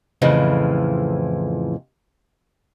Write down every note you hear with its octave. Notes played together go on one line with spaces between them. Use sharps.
F2 A2 C#3 E3 F3